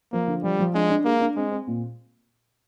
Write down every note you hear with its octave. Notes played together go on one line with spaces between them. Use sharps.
F3 A#3
D3
F3 G3
F3
G#3 D4
D4
G#3 A#3
D4
G#3 C4
C4
A#2